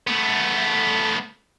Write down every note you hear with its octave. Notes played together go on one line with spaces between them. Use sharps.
A3 B3